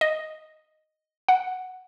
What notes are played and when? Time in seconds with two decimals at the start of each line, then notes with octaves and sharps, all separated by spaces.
0.01 D#5
1.29 F#5